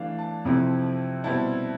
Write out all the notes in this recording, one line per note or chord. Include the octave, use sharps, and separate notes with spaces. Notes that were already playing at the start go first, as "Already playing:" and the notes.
Already playing: E3 A3 D4 E5 F5
A5
F2 C3 F3 C4 E4
B2 G3 C4 E4 A5